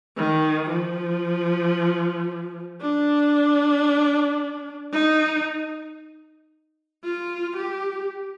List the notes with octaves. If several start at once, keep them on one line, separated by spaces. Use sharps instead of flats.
D#3
F3
D4
D#4
F4
G4